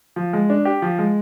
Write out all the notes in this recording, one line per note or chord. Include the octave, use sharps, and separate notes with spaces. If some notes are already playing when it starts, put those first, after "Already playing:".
F3
G#3
D4
G4
F3
G#3